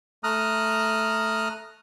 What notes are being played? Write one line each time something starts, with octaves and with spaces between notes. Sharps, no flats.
A3 A#5 D#6 F6 F#6